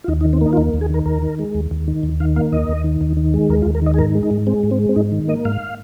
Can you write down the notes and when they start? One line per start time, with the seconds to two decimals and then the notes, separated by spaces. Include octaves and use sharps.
0.04 F4
0.08 D#2 D#4
0.21 D#4
0.25 D#3
0.33 C4
0.41 A#3 D#4
0.53 F4
0.57 D#2 D#4
0.74 D#2
0.81 G#4
0.90 D#3 A#4
1.06 D#2 A#4
1.22 D#3
1.39 G#3
1.55 D#2
1.71 D#2
1.88 D#3
2.03 D#2
2.20 D#3 F5
2.36 A#3 F5
2.52 D#2 D#5
2.69 D#2
2.84 D#3
3.01 D#2
3.17 D#3
3.34 G#3
3.49 D#2 A#4
3.62 F4
3.66 D#2
3.75 A#4
3.82 D#3 D#5
3.94 G#4
3.98 G#2 A#4
4.15 G#3
4.23 D#4
4.31 G#2
4.47 G#3 C4
4.63 G#2
4.71 C4
4.80 G#3
4.89 C4
4.96 G#2 D#4
5.12 D#3
5.28 A#3 D#5
5.45 G#2 F5